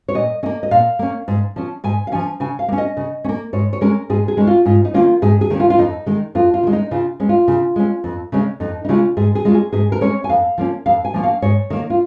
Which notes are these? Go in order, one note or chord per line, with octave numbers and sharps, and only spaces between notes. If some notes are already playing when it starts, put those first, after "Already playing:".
C#5
A#2 D#5
A#3 C#4 D#5
D#5
A#2 F5
A#3 C#4
G#2
F3 C#4
G#2 G#5
F5
F3 C#4 G#5
C#3 G#5
F5
A#3
C#4
D#5
C#3
C#4
A#3
G#2 C#5
C#5
G#3 C#4 A#4
G#2 G#4
G#4
G#3 C#4 D#4
F4
G#2 F4
D#4
D#3 A#3 C#4 F4
G#2 G#4
G#4
D#3 A#3 C#4
F4
F4
F2 D#4
D#3 G#3
F2 F4
F4
D#3 G#3
D#4
C#3 F4
G#3 C#4
F4
C#3
G#3 C#4
F2
C#3 G#3 C#4
F2 D#4
D#4
C#3 G#3 C#4 F4
G#2 G#4
G#4
G#3 C#4 F4
G#4
G#2 G#4
A#4
G#3 C#4 C#5
G#5
F2 F5
F3 A#3 C#4
F2 F5
G#5
F3 A#3 C#4
F5
G#2 C#5
D#3 A#3
F4